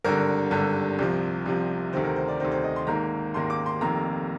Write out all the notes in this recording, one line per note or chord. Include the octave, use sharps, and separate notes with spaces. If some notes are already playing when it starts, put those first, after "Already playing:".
G#1 G2 D3 A#4
G#1 G2 D3
C2 C3 F3
C2 C3 F3
D2 C3 D#3 C5
A#4
C5
D5
D2 C3 D#3 C5
C5
D#5
C6
G#1 G#2 D#3 A#3 A#5
G#1 G#2 D#3 A#3 C6
D6
C6
F1 F2 D#3 A#3 A#5